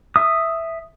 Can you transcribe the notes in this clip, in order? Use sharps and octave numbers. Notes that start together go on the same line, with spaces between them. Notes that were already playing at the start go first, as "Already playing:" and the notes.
E5 D#6